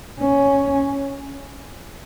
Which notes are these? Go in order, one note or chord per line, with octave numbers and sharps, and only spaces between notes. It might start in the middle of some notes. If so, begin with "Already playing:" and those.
C#4